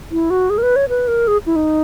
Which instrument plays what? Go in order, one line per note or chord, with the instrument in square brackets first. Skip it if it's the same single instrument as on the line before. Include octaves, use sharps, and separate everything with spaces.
[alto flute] E4
F#4
G#4
A#4
B4
C#5
B4
A#4
G#4
E4
D#4